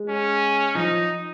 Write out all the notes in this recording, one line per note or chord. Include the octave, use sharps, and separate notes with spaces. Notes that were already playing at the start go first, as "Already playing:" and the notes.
Already playing: G#3
C#4
F3 D#4